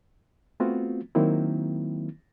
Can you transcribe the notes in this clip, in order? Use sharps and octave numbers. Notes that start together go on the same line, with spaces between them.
A3 B3 C4 F4 F#4
D#3 F#3 A#3 C4 D#4 E4